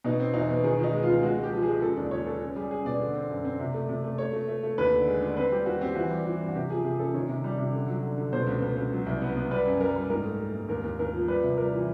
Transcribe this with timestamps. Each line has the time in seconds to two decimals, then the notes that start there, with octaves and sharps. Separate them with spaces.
0.04 B2 D#4
0.20 C4
0.34 E2 D#4
0.49 B2
0.64 D#3 G#4
0.78 D#3
0.84 D#4
0.93 G#3
1.03 F4
1.08 C#2
1.23 G#3 F#4
1.38 G#3
1.43 G4
1.53 F3
1.62 G#3 G#4
1.82 C#3 A4
1.97 D#2 D5
2.11 C#3 C#5
2.26 C#3 A4
2.41 C#4
2.56 G3 G#4
2.71 C#4 G#4
2.85 B2 D5
3.00 D3
3.15 C4
3.30 F#2
3.45 C4
3.59 C3
3.74 A3
3.89 C3
4.04 A3
4.18 A3 C#5
4.33 A3
4.48 A3
4.63 A3
4.78 D#2 B4
4.93 D3
5.07 G#3
5.22 D3
5.37 C4 B4
5.52 G3 G4
5.66 D#2 F#4
5.81 C4 G4
5.95 E3 F#4
6.11 G3
6.26 E3
6.41 G2
6.48 F#4
6.55 C3 G4
6.70 F3 G#4
6.84 C3 G#4
6.99 C#4 A4
7.14 D#3 C#5
7.29 C3
7.44 G3
7.58 C3
7.73 D3
7.88 F#3
8.03 D3
8.18 D3
8.33 B2 C5
8.47 C#2
8.62 C#2
8.76 C#2
8.92 F#3
9.06 C2
9.21 B3
9.36 B3
9.51 G3 B4
9.66 F#2
9.80 G3 A#4
9.96 G3
10.10 G#2 A#4
10.25 A3
10.40 A3
10.55 G#2
10.69 D#2 A#4
10.84 D#2
10.99 D#2 A#4
11.13 F3
11.28 G3 B4
11.43 C3
11.57 G3 A#4
11.73 E3